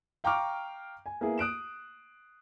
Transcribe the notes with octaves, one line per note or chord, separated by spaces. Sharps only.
F5 G5 A#5 C#6 D6 F6
G#5
A#3 B3 E4 G#4
D#6 F#6 D7 E7